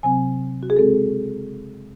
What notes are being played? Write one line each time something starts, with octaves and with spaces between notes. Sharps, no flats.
C3 F#3 C4 G#5
F#4
G#4
C#3 G#3 C4 A4